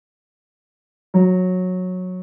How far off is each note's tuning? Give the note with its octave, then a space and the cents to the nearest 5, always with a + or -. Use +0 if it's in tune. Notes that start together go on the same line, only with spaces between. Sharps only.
F#3 -15